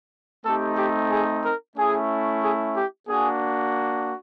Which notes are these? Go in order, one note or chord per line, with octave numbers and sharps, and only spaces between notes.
A3 C4 D#4 G4 A4
G4
G#4
A#4
A3 C#4 E4 G#4
G#4
G4
A#3 D4 F#4 G#4